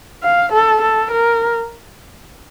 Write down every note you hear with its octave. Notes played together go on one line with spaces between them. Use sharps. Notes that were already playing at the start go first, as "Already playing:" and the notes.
F5
A4
A4
A#4